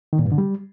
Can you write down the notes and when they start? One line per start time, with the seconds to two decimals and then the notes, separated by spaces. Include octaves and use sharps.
0.13 D#3
0.19 A#2
0.25 G2
0.32 D3
0.38 G3